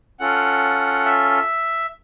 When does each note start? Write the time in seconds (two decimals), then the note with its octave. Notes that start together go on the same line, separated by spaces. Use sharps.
0.20 C#4 F4 A4 F#5
1.05 E5